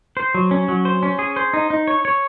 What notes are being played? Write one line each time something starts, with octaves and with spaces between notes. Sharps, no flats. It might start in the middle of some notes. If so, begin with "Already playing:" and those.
C5
F#3
C#4
F#3
C5
C#4
G#4
C5
D#4
D#4
C#5
C#5